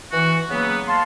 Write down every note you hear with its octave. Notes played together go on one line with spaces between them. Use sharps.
E3 F#4
C#3 F#3 A#3 B3
F5 A5 C6